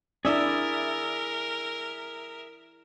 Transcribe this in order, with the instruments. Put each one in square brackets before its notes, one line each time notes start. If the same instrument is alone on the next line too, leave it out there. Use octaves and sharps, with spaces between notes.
[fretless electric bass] C#4 D4 [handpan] E4 D5 [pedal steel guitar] G#4 E5 [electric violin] A#4